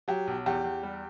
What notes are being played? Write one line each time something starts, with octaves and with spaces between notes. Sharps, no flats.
F#3 G4
B1
E2 G4
E2
G3